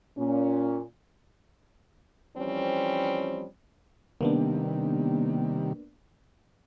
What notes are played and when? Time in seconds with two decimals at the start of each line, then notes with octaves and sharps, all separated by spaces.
0.18 A#2 C#4
2.37 E3 F3 G3 C4 C#4
4.21 C3 D#3 G3 A#3 B3 D4